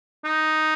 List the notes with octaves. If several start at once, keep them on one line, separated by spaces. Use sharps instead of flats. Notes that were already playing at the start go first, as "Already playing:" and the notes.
D#4